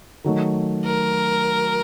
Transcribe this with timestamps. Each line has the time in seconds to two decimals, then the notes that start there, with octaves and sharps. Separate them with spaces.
0.24 D#3 F#3 A3
0.85 A#4